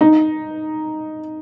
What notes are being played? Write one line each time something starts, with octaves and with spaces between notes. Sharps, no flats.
D#4